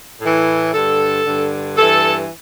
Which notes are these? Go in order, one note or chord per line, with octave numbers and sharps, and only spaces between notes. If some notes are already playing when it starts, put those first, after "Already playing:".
A2
E3
G2 D3 A4
G2 D3
G2 E3 A4